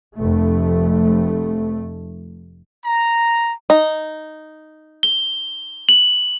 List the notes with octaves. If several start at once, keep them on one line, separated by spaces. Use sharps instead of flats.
F1 A3
A#5
D#4
G7
F#7